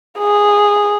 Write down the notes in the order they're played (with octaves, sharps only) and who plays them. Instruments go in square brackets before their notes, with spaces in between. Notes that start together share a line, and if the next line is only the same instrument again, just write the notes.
[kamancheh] G#4